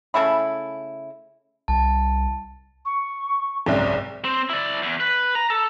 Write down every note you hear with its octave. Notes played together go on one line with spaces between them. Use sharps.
C#3 A3 E4 B5
C2 A5
C#6
F#1 C2 G#2 D5
C4
E4 D5
E2
B4
A#5
A4